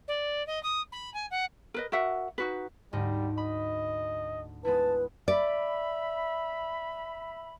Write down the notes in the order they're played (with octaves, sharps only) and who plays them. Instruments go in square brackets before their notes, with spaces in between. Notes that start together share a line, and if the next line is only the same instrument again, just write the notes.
[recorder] D5
D#5
D#6
B5
G#5
F#5
[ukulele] A#4 B4 D#5
F#4 A#4 E5 F#5
D#4 F#4 B4
[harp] D2 G#2 D#5 [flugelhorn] G3
[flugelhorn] D#5 [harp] B5
[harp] G#3 B3 E4 [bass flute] B4 [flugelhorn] A5
[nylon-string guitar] D5 [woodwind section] E5 B5